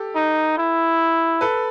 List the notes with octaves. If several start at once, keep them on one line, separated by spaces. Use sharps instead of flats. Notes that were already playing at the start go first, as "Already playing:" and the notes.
Already playing: G4 A4
D#4
E4
A4 B4